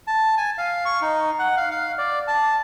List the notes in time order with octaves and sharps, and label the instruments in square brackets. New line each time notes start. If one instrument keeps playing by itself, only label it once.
[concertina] A5
G#5
F5
C#6
D#4
F#5
F5
F5
D5
A5